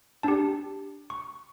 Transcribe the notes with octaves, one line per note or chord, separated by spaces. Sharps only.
D4 G4 A5
C#6